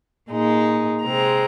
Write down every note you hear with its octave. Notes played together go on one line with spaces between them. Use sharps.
A#2 G#3 D#4
C3 G#3 C4 A#5